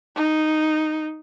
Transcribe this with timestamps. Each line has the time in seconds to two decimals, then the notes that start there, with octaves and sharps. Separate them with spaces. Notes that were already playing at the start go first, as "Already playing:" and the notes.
0.15 D#4